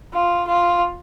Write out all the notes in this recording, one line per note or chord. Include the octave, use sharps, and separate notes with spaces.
F4
F4